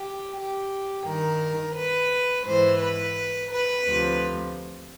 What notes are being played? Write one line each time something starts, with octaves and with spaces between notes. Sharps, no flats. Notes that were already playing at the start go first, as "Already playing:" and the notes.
Already playing: G4
G4
G2 D#3 A#4
B4
G#2 E3 C5
B4
B4
D2 C3 F3